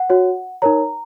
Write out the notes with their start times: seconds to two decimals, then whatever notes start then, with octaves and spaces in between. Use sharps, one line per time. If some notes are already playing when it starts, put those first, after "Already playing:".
Already playing: F#5
0.10 F#4 C#5
0.62 D#4 A#4 C#5 A#5